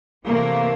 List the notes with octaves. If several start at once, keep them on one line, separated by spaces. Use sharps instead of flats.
C3 E3 A3 A#3